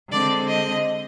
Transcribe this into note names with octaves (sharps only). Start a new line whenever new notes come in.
D3 G#3 C4 D5
D#5